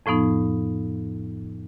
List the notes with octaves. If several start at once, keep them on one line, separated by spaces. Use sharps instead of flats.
F2 A2 F3 B3 D#4